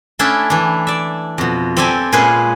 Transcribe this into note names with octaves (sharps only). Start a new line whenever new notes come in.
A3 C#4 D4 E4 E5 F#5
E3 D4
D5 E5
F2 B2
C4 G4 A4 D5 E5 G#5
A#2 G#3 C#4 G#4 B4 C5